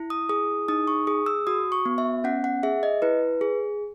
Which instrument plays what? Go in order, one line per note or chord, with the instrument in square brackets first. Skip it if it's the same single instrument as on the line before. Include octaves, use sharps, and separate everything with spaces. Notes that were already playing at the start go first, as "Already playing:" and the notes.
Already playing: [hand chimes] E4
D#6
G#4 D#6
D#4 D#6
C#6
G#4 D#6
E6
F#4 D#6
C#6
B3
E5
C#4 F#5
F#5
G#4 E5
D#5
E4 B4
G#4